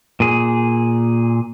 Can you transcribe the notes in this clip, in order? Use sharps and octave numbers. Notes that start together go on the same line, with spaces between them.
A#2 G#4